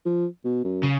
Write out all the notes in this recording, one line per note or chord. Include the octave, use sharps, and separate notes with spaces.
F3
B2
F#2
C#3